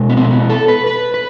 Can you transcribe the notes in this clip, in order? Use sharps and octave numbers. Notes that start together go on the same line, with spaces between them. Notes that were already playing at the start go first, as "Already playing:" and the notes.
Already playing: B2 G#3
B3
C4
B3
A4
B4
B4
B4